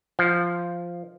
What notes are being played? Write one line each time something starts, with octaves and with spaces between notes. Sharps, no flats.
F3